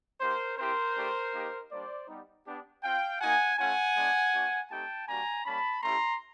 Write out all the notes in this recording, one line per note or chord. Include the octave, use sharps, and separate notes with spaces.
A#3 D#4 G4 A#4 C5
C4 E4 G4 A#4 C5
A3 D4 G4
A#3 D#4 G4
G3 A#3 D4 G4 C5 D5
G3 B3 D#4
B3 D4 G4
C4 F4 F5 G5
A#3 D#4 F#4 F#5 G#5
A3 C#4 F4 F#5 G#5
G#3 B3 D4
A#3 D4 F#4
A3 C4 D#4 G4 G5 A5
G3 A#3 D4 F#4 G#5 A#5
G3 A#3 C#4 A5 B5
A3 C#4 E4 G4 A#5 C6